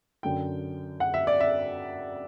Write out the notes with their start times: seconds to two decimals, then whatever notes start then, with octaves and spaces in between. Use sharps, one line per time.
0.23 F#2 D3 G5
1.00 F#5
1.14 E5
1.27 D5
1.40 E5